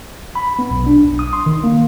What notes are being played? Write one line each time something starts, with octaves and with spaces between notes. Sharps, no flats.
B5
B3
B1
D4
B1
D#6
C6
D#3
A#3